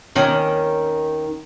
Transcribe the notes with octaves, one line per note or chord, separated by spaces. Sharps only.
D#2 D#3 C#4